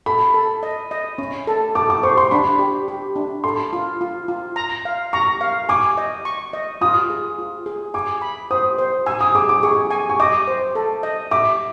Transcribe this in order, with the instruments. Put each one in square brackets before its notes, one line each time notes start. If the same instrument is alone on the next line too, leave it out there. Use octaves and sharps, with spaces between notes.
[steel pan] A4 [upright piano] B5
[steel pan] A4
D#5
D#5
C#4
A4
[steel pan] A4 [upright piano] D6
[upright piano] D6
[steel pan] C5 [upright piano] C#6
[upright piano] C6
[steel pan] D4 [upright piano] B5
[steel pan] G4
G4
D4
[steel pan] A4 [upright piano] C6
[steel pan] F4
F4
F4
A#5
F5
[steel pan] A#5 [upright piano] C#6
[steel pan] F5
[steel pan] G#5 [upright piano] D6
[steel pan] D#5
C#6
D#5
[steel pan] F4 [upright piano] D#6
[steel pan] G#4
F4
G#4
[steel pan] G#5 [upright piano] D6
[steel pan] B5
[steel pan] C5 [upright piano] D#6
[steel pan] C5
[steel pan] G#5 [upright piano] E6
[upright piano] D#6
[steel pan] G#4 [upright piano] D6
[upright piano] D6
[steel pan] G#4 [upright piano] C#6
[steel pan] G#5
[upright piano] C#6
[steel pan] D#5 [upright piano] D6
[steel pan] C5
A4
D#5
[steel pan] E5 [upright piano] D6